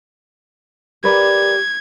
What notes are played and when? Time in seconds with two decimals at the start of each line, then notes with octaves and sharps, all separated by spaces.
1.04 G4 A#4 B4 D5 G#6